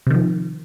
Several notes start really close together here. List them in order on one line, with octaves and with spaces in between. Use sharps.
C3 D#3 F3